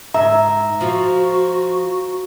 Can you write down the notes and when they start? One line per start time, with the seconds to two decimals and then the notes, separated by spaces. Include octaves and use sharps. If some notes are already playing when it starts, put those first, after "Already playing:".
0.14 G#2 E5 A#5
0.81 F3 F4 F#4